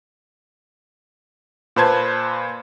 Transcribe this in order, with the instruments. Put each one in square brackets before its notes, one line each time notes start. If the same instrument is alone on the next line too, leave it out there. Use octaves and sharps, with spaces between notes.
[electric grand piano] A#2 B4 C5 A5 G#6